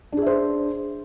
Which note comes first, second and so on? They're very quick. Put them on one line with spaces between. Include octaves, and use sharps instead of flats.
D4 G#4 E5 C5